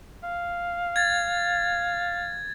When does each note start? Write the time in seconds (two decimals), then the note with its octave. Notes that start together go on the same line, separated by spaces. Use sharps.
0.24 F5
0.96 G#6 A6